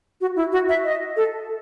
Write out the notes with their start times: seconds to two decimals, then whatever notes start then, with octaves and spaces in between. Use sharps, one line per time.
0.21 F#4
0.36 E4
0.52 F#4
0.69 E5
0.84 D#5
1.17 A4